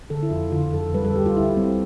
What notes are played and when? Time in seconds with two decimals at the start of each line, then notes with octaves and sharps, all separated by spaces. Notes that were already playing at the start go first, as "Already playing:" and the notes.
0.10 D3 A4
0.23 E4
0.31 F2 F4
0.52 D3 F4
0.73 F2 A4
0.94 G3 B4
1.05 A4
1.15 D2 G4
1.26 F4
1.36 D2 E4
1.57 G3 C4